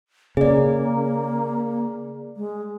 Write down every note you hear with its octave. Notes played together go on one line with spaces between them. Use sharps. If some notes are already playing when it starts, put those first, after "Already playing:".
C#3 A#3 G#4 D5
G#3